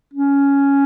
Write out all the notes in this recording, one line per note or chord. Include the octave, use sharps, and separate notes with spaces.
C#4